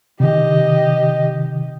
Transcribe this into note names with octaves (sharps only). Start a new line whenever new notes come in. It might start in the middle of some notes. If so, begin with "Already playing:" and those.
C3 D#3 G4 D#5